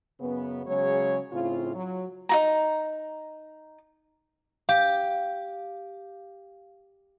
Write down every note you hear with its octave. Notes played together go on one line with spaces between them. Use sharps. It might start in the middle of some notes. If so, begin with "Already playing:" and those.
F#2 C#3 B3
C#3 F#3 G#3 C#5
A2 C#3 C4 F4
F#3
D#4 F#4 A#5
G4 F5